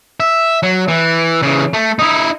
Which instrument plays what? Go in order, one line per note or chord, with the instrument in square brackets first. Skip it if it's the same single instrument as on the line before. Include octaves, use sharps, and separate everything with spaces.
[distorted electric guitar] E5
F#3
E3
C#3 E3
A3
D#4 E4